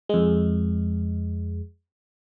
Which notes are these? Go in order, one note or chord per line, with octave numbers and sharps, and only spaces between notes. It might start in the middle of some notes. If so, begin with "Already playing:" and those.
F2 G#3